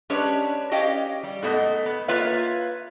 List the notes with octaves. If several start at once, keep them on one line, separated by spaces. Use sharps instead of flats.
G#3 C#4 D4 G4 B4 C#5
C#4 G4 D#5 F5 G5
G3
G#2 A3 B3 D#5
B3
A#3 F4 B4 C#5 E5 F5